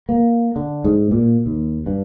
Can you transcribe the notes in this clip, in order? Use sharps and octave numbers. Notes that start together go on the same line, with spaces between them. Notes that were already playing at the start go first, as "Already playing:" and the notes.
A#3
D3
G#2
A#2
D#2
G2